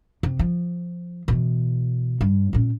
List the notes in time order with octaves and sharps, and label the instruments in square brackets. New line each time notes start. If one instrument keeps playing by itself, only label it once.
[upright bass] C3
F3
B2 E3
G2
A#2 C#4